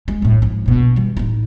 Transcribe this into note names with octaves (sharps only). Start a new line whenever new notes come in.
G#3
A#1 A2
G#2 F3
A#1 B2
E3 G3
A1 D#4